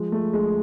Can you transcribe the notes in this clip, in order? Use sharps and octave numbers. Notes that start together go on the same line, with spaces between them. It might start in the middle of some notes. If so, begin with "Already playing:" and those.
Already playing: F3 G#3
A3
D2 G#3